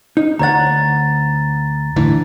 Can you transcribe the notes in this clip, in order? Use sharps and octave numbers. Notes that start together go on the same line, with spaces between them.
D#4
D2 C#5 F#5 A#5 A6
A2 D3 E3